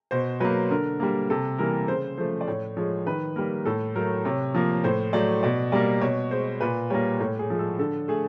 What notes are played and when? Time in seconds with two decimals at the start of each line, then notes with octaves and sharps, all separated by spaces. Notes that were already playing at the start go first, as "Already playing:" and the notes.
0.11 B2 C5
0.40 F#3 A#3 B4
0.70 D3 A#4
1.00 G3 A#3
1.30 C3 A4
1.59 E3 G3 A#3 A#4
1.88 C#3 C5
2.18 F3 A3 C5
2.41 D5
2.48 A2 C#5
2.77 F3 G#3 C#5
3.07 D#3 B4
3.36 G3 A#3 A#4
3.66 A2 A4
3.95 F#3 A3 A#4
4.25 C3 C#5
4.54 F3 A#3
4.84 A2 C5
5.13 F#3 A3 D5
5.43 B2 D5
5.72 G3 A#3 D5
6.01 B2 C#5
6.31 G#3 C5
6.61 A#2 B4
6.90 G3 A#3 C#5
7.20 A2 C#5
7.39 G#4
7.50 F3 G#3
7.59 A4
7.79 D3 A4
8.08 A3 G#4